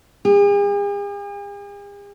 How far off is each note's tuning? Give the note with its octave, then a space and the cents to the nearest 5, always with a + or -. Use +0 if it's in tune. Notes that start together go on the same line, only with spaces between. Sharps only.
G#4 -45